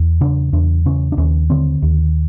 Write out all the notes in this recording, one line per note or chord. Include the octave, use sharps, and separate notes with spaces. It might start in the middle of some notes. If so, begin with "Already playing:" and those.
Already playing: E2
C#3 D4
E2 D4
C#3 C#4
D4
D#2 C#4
D3 C4
D#2